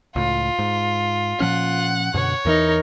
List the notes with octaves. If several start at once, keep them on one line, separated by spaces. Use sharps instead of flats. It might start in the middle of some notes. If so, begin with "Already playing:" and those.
C#2 A2 F4
G#2
A#2 F3 C#4 F#5
F#2 B2 D3 C#5
E2 E3 D#4 A#4